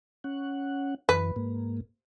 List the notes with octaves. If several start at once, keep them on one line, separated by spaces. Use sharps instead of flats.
C#4 F#5
F#2 E3 B4
G#2 A#3